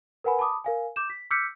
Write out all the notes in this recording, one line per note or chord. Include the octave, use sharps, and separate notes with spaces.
A#4 B4 F#5 G#5 B5
A5 B5 D6 D#6
A#4 F5 G#5
D6 G6 E7
B6
D6 E6 F6 G6 B6 C#7